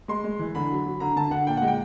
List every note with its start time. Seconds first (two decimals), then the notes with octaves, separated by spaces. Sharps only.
0.08 G#3 C6
0.24 G#3
0.39 E3
0.55 D3 B5
0.71 F#3
0.85 F#3
1.00 D3 A#5
1.16 D3 A5
1.31 D3 F#5
1.47 A#2 G5
1.57 G#3 F#5
1.67 G5